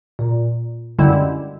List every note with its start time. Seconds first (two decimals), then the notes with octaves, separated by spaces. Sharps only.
0.19 A#2
0.99 F#2 D3 G3 G#3 E4